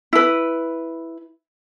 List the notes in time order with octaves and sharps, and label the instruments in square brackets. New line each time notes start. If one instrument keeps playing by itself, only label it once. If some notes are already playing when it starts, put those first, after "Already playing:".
[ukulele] E4 B4